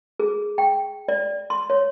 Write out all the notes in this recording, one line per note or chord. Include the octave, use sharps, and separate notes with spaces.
G#4
G5
D5
C6
C#5